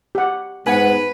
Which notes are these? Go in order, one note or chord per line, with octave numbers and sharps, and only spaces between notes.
G4 F#5
G#2 B3 B4 F#5 G#5